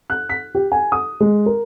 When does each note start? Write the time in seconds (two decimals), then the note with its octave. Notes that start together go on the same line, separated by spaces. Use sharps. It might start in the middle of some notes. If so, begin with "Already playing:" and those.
0.10 F#6
0.29 B6
0.55 G4
0.72 G#5
0.92 D#6
1.20 G#3
1.46 A#4